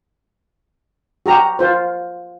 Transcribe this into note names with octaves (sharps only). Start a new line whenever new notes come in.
F#4 G4 A#5
F4 C5